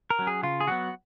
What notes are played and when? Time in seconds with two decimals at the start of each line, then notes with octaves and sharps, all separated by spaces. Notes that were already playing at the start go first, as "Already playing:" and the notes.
0.10 A#4
0.19 F#3 C#4
0.27 G#4
0.43 C#3 F4
0.61 G#4
0.67 F#3 B3 F#4